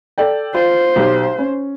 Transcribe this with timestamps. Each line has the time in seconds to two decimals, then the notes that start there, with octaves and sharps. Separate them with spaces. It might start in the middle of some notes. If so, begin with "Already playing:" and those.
0.18 A4 D5 G5
0.54 F4 C5
0.96 B1 G4
1.38 C#4